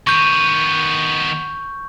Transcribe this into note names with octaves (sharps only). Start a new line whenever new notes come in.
D#3 B3 C#6 G6